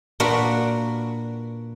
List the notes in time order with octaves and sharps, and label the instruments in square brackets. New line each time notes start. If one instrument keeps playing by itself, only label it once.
[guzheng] A#2 A#3 D4 F#4 B4 F#5